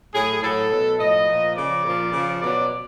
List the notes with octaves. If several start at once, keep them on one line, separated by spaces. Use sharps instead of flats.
A2 F#3 G#4
A2 F#3 A4
B2 F#3
A2 F3 D#5
A#2 F3
C#3 F3 D5
A#2 F3
C#3 F3
B2 F#3 D5